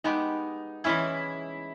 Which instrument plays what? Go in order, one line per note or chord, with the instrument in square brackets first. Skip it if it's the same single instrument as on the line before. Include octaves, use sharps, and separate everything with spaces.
[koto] G#3 B3 G4 [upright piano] D#4
[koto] E3 G#3 C#4 G#4 [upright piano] E4